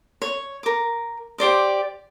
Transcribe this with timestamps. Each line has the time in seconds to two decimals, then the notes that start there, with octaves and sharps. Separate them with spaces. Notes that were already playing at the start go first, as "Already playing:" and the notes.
0.22 C#5
0.63 A#4 D6
1.38 G4 C5 D5 D6